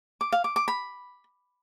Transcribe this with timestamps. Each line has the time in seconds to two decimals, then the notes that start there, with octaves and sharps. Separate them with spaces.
0.21 D6
0.32 F5
0.44 D6
0.56 D6
0.68 B5